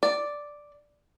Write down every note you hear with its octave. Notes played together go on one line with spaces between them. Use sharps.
D5